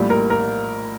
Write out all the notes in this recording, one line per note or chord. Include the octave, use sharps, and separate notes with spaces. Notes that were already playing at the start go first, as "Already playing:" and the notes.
Already playing: A#1 A2 G3
A#4
A#4